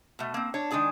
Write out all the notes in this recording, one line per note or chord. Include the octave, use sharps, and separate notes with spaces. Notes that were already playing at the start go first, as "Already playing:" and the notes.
B2 A3
A#3 C4
D4 C#5
D#3 G#3 D4 G#4 G#5